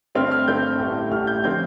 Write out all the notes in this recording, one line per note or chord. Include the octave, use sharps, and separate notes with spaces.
G2 D3 A3 C4 F6
F6
G2 D3 A3 C4 G6
A1 A2 G3
A1 A2 G3 F6
G6
D3 F3 C4 G6